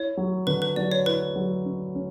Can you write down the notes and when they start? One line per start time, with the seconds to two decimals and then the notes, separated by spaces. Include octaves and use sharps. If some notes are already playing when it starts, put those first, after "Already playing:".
Already playing: E4 C#5
0.17 F#3
0.47 D3 B4
0.62 B4
0.76 F#3 D5
0.91 C#5
1.06 E4 B4
1.36 F#3
1.66 C#4
1.95 C#4